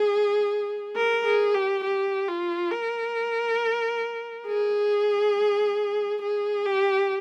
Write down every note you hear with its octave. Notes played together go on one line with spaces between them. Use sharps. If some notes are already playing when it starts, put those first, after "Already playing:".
Already playing: G#4
A#4
G#4
G4
G4
F4
A#4
G#4
G#4
G4